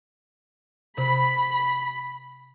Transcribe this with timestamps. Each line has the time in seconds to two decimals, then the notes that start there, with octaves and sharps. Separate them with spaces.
0.98 C3 B5